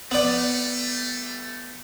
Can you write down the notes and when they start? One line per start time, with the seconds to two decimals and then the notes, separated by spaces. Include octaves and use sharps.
0.11 G3 A3 B3 D5